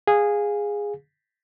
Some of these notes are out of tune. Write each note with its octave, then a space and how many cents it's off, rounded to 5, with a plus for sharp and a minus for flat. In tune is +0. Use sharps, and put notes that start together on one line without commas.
G#4 -10 F5 +15